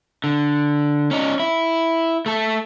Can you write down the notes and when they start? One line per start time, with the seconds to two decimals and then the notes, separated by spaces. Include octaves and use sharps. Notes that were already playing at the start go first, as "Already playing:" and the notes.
0.24 D3
1.11 C#4 D#4
1.40 E4
2.26 A3 A4